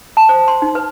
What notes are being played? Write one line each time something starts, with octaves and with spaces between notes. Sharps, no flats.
A5
C5
C6
D#4
B4